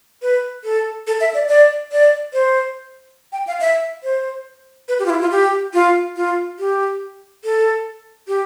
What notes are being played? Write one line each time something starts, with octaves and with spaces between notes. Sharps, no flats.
B4
A4
A4
E5
D5
D5
D5
C5
G5
F5
E5
C5
B4
G4
F4
E4
F4
G4
F4
F4
G4
A4
G4